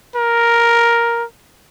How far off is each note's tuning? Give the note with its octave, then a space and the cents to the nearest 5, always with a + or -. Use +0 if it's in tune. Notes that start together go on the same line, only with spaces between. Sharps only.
A#4 +5